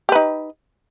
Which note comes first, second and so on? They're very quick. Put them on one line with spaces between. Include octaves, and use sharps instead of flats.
G4 B4 D#4